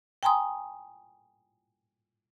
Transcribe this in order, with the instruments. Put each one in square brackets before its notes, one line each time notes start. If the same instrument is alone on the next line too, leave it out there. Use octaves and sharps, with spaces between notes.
[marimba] G5 G#5 A#5 C6 D#6